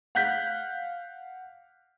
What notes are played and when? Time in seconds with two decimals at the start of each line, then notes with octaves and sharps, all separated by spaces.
0.15 F5 F#5 F#6 G6 B6